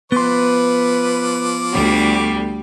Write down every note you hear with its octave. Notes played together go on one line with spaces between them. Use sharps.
F3 B3 B4 C6 D6
D2 G3 F#4